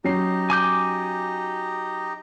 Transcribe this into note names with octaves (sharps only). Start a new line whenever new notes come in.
F#3 C#4 D#4 G4 D#5 C7
G#5 D6 G6